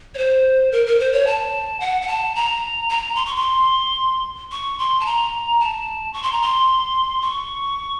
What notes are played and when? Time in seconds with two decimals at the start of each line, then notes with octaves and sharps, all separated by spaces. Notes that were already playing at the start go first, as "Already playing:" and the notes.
0.15 C#5
0.18 C5
0.72 A#4
0.86 A#4
0.99 C5
1.13 C#5
1.27 A5
1.80 F#5
2.02 F#5
2.08 A5
2.35 A#5
2.89 A#5
3.15 C6
3.26 C#6
3.36 C6
4.52 C#6
4.79 C6
5.00 A5
5.06 A#5
5.60 A5
6.13 C#6
6.23 C6
6.32 A#5
6.42 C6
7.22 C#6